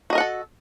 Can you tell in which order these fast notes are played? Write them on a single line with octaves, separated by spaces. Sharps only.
F#4 D#5 A#4 F#5 A4